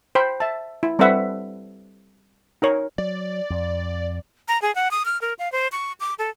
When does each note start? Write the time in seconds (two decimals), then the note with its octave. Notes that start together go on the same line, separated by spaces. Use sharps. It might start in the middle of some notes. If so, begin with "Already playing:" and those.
0.15 C5 G5 B5
0.40 E5 A5
0.83 E4
0.99 G3 C4 A4 B4 E5 F#5
2.62 D#4 A#4 C#5
2.98 F#3 D5
3.50 F2
4.48 A#5
4.62 G#4
4.75 F#5
4.91 D#6
5.05 F6
5.22 A#4
5.39 F5
5.52 C5
5.72 C#6
6.00 D6
6.19 A4